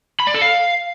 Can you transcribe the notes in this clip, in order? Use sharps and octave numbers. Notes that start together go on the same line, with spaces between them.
B5
D5
A4
F5